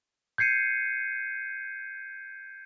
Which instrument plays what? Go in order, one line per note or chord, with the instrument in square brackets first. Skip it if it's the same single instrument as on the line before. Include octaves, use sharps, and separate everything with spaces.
[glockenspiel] G6 G#6 C7 C#7 D#7